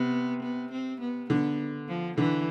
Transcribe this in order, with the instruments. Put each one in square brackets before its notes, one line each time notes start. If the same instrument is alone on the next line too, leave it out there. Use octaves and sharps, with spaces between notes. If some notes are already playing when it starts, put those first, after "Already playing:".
Already playing: [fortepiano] C3 [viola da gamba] B3
[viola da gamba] B3
C4
B3
[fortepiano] D3 [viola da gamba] B3
[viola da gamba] F3
[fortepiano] D3 [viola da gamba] E3